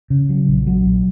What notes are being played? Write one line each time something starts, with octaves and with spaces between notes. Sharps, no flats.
C#3
F#3
A#1
F#3
A#1